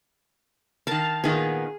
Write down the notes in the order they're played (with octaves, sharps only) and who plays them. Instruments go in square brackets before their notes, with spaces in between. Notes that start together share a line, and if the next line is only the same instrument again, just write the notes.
[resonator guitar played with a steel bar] D#3 A#4 [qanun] F5 A5
[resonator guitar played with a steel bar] A#2 D#3 B3 [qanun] G#4